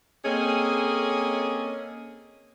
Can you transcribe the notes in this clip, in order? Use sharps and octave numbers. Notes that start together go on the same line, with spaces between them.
A#3 C4 C#4 G#4 A4 D#5